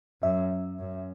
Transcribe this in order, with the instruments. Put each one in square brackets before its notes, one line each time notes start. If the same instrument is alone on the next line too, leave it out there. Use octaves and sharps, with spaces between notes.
[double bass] F#2 [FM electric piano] E5
[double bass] F#2